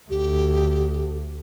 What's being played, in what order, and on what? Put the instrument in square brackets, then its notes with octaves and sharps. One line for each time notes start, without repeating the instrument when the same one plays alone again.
[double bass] D2 [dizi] G4